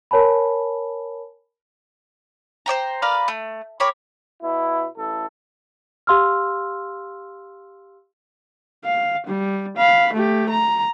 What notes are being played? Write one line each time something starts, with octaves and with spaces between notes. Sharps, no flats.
A#4 C#5 G#5 A5 B5
C5 D5 G5 A#5
A#4 B4 D5 F5
A3
G4 A#4 C#5 B5
B2 E4
A1 E4 A4
G4 F5 C6 E6 F6
F5
G3
F5 B5
A3 G4
A#5